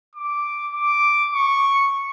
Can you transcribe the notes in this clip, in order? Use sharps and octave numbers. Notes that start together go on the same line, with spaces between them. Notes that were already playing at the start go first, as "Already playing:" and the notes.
D6
D6
C#6